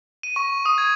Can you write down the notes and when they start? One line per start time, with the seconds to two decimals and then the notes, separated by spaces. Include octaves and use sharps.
0.23 D#7
0.36 C#6
0.66 D#6
0.78 G#6